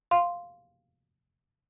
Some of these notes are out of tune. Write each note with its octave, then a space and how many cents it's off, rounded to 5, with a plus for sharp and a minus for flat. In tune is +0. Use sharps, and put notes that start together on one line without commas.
F5 +0 C6 +0